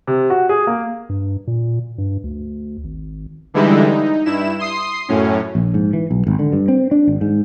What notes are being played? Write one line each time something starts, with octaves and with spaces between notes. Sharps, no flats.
C3
F#4
G#4
A#3
G2
A#2
G2
D2
G#1
D3 E3 G3 G#3 D#4 E4
D#4
G2 E4 E7
C6 D#6 C7
F#2 A2 C#4
A#1
G#2
E3
B1
G#1
D3
G2
C4
D4
G#1
G#2